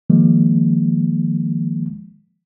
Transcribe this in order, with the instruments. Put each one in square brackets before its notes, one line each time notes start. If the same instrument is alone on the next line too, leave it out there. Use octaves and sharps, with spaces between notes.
[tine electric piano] D#3 F3 G#3 A#3